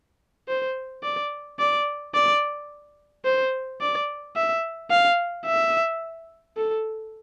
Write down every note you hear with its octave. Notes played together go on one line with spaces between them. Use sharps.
C5
D5
D5
D5
C5
D5
E5
F5
E5
A4